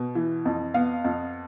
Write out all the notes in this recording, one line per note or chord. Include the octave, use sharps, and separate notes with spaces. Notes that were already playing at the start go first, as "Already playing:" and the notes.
Already playing: B2
E3
F2
B3 F5
F2